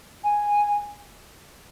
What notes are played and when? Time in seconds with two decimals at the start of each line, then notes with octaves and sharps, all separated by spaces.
0.24 G#5